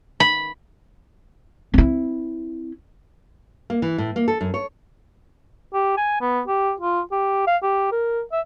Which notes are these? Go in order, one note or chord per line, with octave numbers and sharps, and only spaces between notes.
B5
C4 E4
A#3
E3
A2
A#3
A4
F#2
C#5
G4
G#5
B3
G4
F4
G4
F5
G4
A#4
E5